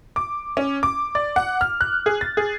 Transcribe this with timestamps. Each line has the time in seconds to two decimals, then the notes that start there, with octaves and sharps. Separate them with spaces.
0.16 D6
0.57 C#4
0.83 D6
1.15 D5
1.36 F#5
1.61 F6
1.81 F#6
2.06 G#4
2.21 A6
2.37 G#4